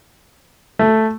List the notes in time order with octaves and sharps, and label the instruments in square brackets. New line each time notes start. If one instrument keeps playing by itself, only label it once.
[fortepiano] A3